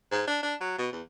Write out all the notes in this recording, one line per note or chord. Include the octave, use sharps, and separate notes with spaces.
G#2
D4
D4
F#3
B2
E2